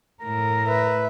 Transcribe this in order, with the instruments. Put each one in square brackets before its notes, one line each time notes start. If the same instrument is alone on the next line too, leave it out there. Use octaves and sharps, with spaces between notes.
[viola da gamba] A2 A3 [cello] A#4
[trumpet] B4 [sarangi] E5